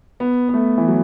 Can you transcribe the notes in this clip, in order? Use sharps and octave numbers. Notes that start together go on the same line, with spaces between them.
B3
B3
A3
E3
F#3